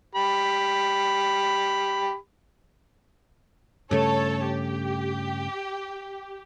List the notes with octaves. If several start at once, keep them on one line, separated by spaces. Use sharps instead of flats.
G4 B5
G2 C#3 A3 A4 C#5 A5
G4